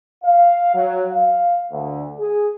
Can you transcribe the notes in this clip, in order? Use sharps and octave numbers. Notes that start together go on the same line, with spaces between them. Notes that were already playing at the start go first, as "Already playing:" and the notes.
F5
F#3
F5
D2
G#4